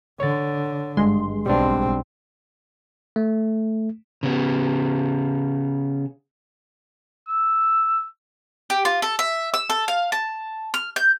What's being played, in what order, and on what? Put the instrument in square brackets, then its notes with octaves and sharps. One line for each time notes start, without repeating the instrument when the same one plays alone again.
[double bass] D3 [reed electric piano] C#5 A6
[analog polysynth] G#1 G#3 C6 [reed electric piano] G2
[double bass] B1 C4 [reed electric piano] G3 D4
[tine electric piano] A3
[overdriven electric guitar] C#3 B3
[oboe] E6
[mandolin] G4
F4
A4
E5
E6
A4
F5
A5
F6
G6